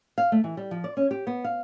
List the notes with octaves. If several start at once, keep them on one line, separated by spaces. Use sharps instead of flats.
F5
A3
E3
G3
F3
D5
C#4
G4
B3
F5